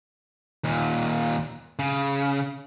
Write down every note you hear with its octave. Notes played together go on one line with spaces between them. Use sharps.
D#2 A#2
C#3